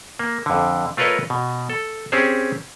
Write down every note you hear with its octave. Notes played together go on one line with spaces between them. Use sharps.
A#3
F2 D3
A3 F4 A#4 B4 C#5 D#5
B2
A4
C4 C#4 G4 G#4 C5